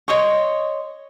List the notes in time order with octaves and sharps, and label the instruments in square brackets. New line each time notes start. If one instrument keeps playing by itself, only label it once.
[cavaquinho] C#5 D#5 C6 C#6